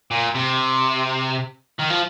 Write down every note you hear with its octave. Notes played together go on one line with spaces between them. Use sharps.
A#2
C3
D#3
F3